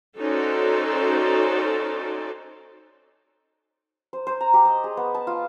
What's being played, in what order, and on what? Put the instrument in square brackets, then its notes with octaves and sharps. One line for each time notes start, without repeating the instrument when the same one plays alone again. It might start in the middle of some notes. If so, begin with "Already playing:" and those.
[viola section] C#4 D#4 F#4 A4 C5 D5
[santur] C5
C5
A#5
G4
D#5
G#4
B3
A5
F4